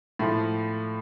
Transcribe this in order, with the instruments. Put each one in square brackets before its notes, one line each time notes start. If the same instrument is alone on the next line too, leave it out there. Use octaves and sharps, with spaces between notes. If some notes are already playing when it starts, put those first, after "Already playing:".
[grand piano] A2 F3 A3 F4